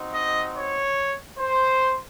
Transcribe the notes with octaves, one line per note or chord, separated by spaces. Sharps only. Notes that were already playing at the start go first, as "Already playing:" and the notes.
Already playing: C4 D#4 F#4
D#5
C#5
C5